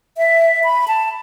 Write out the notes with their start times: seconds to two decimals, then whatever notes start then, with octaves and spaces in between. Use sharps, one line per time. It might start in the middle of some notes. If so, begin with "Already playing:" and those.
0.18 E5
0.64 B5
0.88 A5